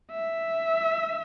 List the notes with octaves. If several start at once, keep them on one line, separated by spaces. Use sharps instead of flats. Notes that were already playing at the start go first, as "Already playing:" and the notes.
E5